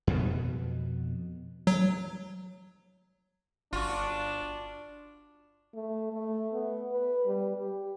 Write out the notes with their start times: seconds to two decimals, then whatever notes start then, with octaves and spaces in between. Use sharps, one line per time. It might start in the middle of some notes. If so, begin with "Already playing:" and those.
0.07 F2 B2 B3
1.67 F#3
3.73 G1 D4 F4 F#4
5.74 A3
6.13 A3
6.53 B3
6.92 B4
7.26 G3
7.57 G4